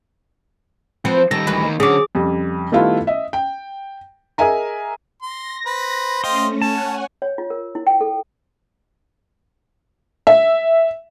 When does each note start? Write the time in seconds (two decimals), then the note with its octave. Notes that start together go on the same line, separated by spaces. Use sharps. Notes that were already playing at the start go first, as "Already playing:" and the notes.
1.05 F3 C4 F#4 B4
1.31 D#3 G3 A4 A#6
1.47 D2 E3 B4
1.65 D#3 A#3
1.80 D3 F#3 C#4 G#4 D6
2.15 F2 C#3 G3
2.72 D#3 G3 A3 B3 E4 F4
3.07 D#5 E5
3.33 G5
4.38 G#4 A#4 D#5 E5 G#5 A#5
5.22 C6 A#6
5.66 B4 C5 B5
6.24 A3 C#4 D#5 F5 G5 C6
6.62 C#4 C#5 F#5 G#5 A5
7.22 C#5
7.38 F4
7.50 A#4
7.75 E4
7.87 G5
8.01 A4
10.27 E5